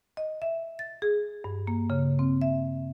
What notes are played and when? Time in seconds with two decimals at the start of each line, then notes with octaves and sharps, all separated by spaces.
0.17 D#5
0.42 E5
0.79 A6
1.02 G#4
1.44 G2
1.67 A#3
1.90 C#3
2.19 C4
2.41 E5